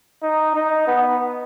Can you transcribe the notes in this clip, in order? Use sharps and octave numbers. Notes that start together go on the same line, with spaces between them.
D#4
D#4
B3